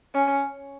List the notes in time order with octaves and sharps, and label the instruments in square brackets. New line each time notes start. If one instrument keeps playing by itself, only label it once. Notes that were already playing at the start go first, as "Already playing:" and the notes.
[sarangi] C#4